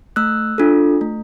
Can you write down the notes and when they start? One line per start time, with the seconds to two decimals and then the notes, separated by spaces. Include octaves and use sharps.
0.16 A3 E6 F#6
0.58 D4 F4 A4
1.01 A3